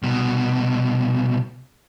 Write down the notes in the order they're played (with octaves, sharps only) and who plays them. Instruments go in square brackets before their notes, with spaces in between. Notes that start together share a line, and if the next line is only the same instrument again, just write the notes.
[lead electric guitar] C2 B2